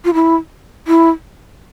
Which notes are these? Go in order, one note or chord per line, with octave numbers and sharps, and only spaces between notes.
F4
E4
E4